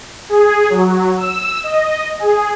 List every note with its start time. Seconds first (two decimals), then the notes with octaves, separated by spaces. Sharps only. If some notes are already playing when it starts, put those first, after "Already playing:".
0.29 G#4
0.70 F#3
1.18 E6
1.64 D#5
2.19 G#4